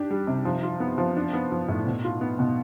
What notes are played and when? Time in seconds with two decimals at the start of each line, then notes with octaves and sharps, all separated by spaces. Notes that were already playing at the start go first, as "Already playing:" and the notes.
Already playing: D4 G4
0.10 G3
0.27 C3
0.45 F3
0.63 F4
0.80 B3
0.98 F3
1.17 D4
1.34 B3
1.52 F3
1.68 A2
1.86 B2
2.04 F4
2.21 B3
2.39 B2